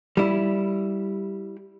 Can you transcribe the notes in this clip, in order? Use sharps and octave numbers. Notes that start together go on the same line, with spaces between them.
G3 E4